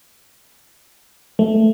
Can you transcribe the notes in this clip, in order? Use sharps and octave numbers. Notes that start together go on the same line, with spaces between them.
A3